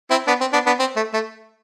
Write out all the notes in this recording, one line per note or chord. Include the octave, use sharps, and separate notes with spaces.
C4 E4
B3 D4
C4
B3 D4
B3 D4
C4
A3
A3